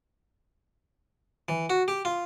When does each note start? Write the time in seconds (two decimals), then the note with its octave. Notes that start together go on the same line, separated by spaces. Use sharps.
1.49 E3
1.70 F#4
1.88 G4
2.05 F4